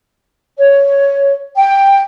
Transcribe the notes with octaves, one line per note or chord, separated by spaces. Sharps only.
C#5
G5